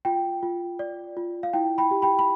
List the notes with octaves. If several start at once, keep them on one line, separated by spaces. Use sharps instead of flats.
F4 G5
F4
D5
F4
F5
E4 G5
G5 B5
G4
G5 B5
B5